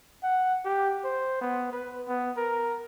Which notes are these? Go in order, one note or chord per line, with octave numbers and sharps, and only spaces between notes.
F#5
G4
C5
B3
B4
B3
A#4